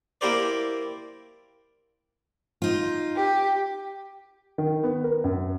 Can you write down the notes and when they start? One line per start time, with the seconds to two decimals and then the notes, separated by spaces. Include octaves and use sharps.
0.21 A#3 E4 G4 A#4 C5 D5
2.62 D#4 F4
3.16 G4
4.58 D#3
4.84 B3
5.04 A#4
5.24 F#2